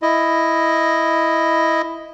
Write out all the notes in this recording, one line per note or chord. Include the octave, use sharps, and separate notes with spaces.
E4 D#5